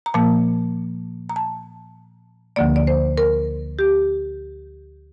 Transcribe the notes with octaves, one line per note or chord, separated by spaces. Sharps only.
A#5
A#2 F3 A#3 A5
A#5
A5
D2 D3 F3 A#3 D5
D5
C5
A#4
G4